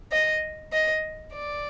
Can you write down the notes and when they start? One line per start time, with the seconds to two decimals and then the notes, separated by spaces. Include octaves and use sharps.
0.12 D#5
0.72 D#5
1.33 D5